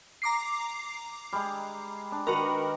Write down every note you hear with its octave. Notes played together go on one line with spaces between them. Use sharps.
A#5 D6 C7
G3 G#3
D4
D#3 F#4 A#4 B4